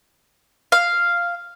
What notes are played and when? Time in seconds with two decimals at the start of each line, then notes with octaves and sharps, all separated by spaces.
0.72 F5